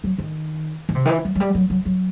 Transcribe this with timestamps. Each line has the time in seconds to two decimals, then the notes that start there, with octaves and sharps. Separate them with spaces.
0.04 F#3
0.18 D#3
0.89 D#3
0.95 C3
1.05 D#3
1.09 E3
1.25 F#3
1.35 F#3
1.40 G3
1.55 F#3
1.70 F#3
1.85 F#3